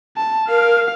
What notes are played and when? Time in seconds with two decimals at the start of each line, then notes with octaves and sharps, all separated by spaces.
0.17 A5
0.49 A#4 F5